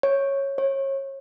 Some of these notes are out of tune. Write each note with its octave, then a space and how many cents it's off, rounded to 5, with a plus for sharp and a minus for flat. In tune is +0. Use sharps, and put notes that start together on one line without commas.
C#5 -10
C#5 -30